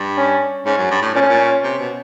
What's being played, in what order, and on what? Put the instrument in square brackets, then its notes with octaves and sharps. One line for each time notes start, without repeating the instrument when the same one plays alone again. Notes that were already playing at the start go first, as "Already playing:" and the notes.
Already playing: [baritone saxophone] G2
[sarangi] C#4
[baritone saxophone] G#2 [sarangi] C#4
[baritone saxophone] F#2
G2
A2
[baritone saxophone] A#2 [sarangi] C#4
[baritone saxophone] A2
A#2
C3
B2